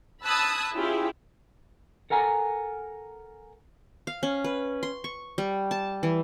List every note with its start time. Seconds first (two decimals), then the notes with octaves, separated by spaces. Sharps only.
0.23 A5 B5 D#6 E6 F#6 G#6
0.75 C#4 E4 F4 G4 G#4
2.10 A4 A#4 F#5 G#5 A#5
4.07 F5
4.23 C#4
4.44 B4
4.83 C6
5.04 C#6
5.38 G3
5.71 A5
6.03 E3